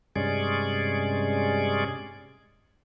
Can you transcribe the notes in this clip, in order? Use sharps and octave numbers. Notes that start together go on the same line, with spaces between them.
G2 C3 G#3 C#4 G#4 D5